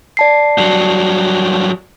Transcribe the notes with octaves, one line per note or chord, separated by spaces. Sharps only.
D5 A5 C7
G2 F#3